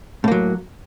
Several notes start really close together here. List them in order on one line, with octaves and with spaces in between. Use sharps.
A2 A#3 F#3